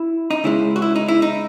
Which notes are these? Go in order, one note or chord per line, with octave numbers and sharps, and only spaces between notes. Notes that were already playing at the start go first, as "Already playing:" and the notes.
Already playing: E4
D#4
C#2 C#3 G#3 E4
F#4
E4
D#4
E4
D#4